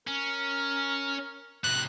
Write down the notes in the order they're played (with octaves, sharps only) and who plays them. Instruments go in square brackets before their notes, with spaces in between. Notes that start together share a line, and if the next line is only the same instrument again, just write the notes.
[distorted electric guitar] C#4 [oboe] A#4
[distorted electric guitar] A2 C3 [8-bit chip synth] F#6